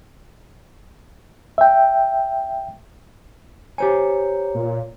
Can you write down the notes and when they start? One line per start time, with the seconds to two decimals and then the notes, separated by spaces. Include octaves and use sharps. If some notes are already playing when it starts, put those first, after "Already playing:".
1.58 E5 G5
3.78 G4 C5 C#5 G#5 A#5
4.55 A#2